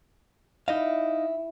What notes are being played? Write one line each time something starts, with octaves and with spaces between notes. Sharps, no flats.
D#4 E4 D#5 F5